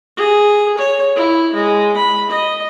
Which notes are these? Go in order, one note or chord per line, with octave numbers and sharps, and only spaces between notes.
G#4
C#5
E4
G#3
B5
D#5